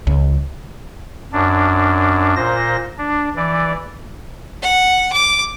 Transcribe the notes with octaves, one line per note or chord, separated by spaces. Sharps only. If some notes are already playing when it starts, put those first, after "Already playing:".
C#2
F#2 D4
A#2 C5 A#6
D4
E3 D5
F#5
D6